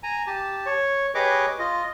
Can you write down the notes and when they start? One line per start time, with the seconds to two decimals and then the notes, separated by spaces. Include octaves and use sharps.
0.03 G#5 A#5
0.27 G4 A5
0.66 C#5
1.15 G4 G#4 B4 C#5 D#5 D6
1.59 F4 D#5